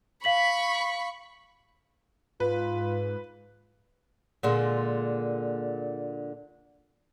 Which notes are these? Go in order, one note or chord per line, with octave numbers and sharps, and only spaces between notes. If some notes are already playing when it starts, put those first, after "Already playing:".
F5 B5 C#6 B6 F#7
G#2 F4 B4
A#2 D3 G#3